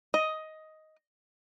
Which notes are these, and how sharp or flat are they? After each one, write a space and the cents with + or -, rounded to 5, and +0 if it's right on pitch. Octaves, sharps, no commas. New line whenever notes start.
D#5 +10